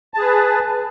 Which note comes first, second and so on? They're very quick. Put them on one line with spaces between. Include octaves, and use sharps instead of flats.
A5 G#4 B4